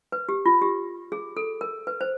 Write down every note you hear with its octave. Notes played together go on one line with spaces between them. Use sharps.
B4
G4
F4
G4
G#4
A4
A#4
B4
C5